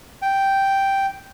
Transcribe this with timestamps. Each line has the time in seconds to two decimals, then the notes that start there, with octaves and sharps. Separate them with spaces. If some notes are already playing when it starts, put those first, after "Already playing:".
0.22 G5